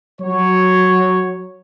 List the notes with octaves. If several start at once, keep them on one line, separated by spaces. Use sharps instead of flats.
F#3 C#5